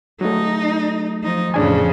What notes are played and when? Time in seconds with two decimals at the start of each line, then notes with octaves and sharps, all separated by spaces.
0.21 F#3 A3 D#4
1.23 F3 D#4
1.54 F2 A2 C#3 D4 G#5